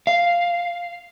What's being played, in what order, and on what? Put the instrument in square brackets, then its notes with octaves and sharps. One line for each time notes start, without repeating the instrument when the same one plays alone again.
[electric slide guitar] F5